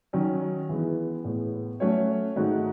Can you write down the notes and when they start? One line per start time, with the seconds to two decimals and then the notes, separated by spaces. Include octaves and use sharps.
0.13 D#3 F#3 C#4
0.69 E3 G#3 B3
1.24 A2 G#3 B3
1.80 F#3 A3 C#4 F#4 C#5
2.36 G#2 D#3 A3 D#4 F#4